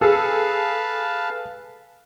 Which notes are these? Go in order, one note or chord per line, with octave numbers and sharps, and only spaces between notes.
G#4 A4 B4 F5 A5